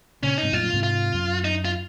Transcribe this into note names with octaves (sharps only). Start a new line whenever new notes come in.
A#2 C#3 C#4
D#4
G#2 C3
F#2 A#2 F4
F#2 A#2
G#2 C3
F4
F#2
D#4
F4